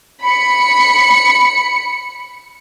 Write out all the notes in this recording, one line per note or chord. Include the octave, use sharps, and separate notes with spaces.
B5 C#7